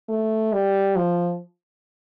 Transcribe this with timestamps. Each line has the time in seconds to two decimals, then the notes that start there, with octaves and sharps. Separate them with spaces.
0.09 A3
0.53 G3
0.96 F3